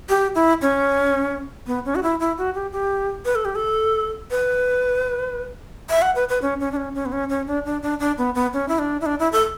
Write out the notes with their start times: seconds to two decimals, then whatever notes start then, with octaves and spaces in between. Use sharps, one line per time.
0.09 G4
0.35 E4
0.62 C#4
1.67 B3
1.85 C#4
1.95 F#4
2.03 E4
2.20 E4
2.38 F#4
2.55 G4
2.72 G4
3.25 B4
3.35 A4
3.45 G4
3.55 A4
4.31 B4
5.90 E5
6.02 F#5
6.15 B4
6.29 B4
6.42 C#4
6.60 C#4
6.72 D4
6.77 C#4
6.95 C#4
7.06 B3
7.12 C#4
7.29 C#4
7.47 D4
7.66 D4
7.82 D4
8.00 D4
8.18 B3
8.35 B3
8.53 C#4
8.68 E4
8.79 D4
9.01 E4
9.06 D4
9.19 E4
9.32 A4